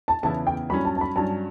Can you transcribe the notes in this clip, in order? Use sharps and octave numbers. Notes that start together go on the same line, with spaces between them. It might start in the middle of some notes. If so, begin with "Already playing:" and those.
A5
E2 C#3 E3 B3 E4 A5
G5
G2 F#3 C#4 B5
A5
A5
B5
G2 F#3 C#4 A5